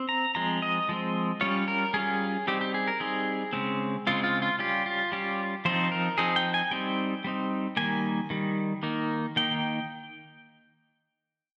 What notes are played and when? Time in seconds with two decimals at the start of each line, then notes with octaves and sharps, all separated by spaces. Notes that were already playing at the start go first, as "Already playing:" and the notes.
Already playing: C4
0.09 A#5
0.35 F3 G#3 C4 A#5
0.62 D#5
0.89 F3 G#3 C4
1.41 G3 C#4 F4 C#5
1.68 A#4
1.94 G3 C#4 F4 G#4
2.47 G3 C4 D#4 G4
2.61 G4
2.74 G#4
2.88 A#4
3.00 G3 C4 D#4 G#4
3.53 C#3 G#3 C4
4.07 C#3 G#3 C4 F4
4.24 F4
4.42 F4
4.59 G3 C#4 F4 G4
4.86 F4
5.12 G3 C#4 F4 G4
5.65 F3 C4 D#4 C5
5.92 A#4
6.18 F3 C4 D#4 G#4
6.36 G5
6.54 G#5
6.71 G3 C4 D#4 G5
7.24 G3 C4 D#4
7.77 D#3 G3 A#3 G#5
8.30 D#3 G3
8.83 D#3 A#3 D#4
9.36 D#3 A#3 D#4 G5